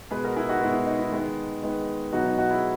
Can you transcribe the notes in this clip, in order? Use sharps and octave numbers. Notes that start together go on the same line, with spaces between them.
B2 G#3 B3 G#4 B4
F#4 A#4
E4 G#4
D#4 F#4
B2 G#3 B3 E4
E4
D#4
E4
D#3 G#3 B3 D#4
D#3 G#3 B3
B2 F#3 B3 D#4 F#4
D#4
D#4 F#4
E4 G#4